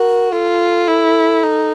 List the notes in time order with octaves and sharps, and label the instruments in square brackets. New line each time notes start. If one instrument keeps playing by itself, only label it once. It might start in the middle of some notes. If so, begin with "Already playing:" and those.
Already playing: [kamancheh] F#4 [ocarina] A#4
[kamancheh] F4 [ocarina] A4
[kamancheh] E4
D#4